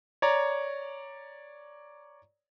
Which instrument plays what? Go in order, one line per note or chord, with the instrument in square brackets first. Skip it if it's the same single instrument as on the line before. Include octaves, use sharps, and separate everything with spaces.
[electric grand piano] C#5 D5 A#5